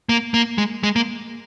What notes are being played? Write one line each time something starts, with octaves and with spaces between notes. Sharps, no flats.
A#3
A#3
G#3
G#3
A#3